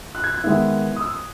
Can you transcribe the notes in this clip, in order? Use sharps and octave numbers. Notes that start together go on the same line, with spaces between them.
F#6
G#6
G#6
D#3 G#3 B3 E4
D#6
E6
D#6